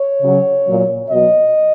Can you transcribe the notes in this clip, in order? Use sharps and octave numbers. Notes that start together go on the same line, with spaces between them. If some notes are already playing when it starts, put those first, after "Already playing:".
Already playing: C#5
C#3 F#3
A#2 F#3
B2 F#3 D#5